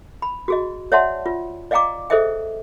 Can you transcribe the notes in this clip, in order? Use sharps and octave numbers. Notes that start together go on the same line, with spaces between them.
B5
F#4 G#4 D#5
C#5 D5 E5 F#5 A5 C6
F4
D5 D#5 F5 G5 A#5 D6
G#4 A4 C5 D#5 E5 G5